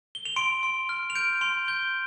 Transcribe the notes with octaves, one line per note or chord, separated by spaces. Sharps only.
G7
F7
C6 D7
C6
F6
F7
G6 D7
C6 F7
G6 G7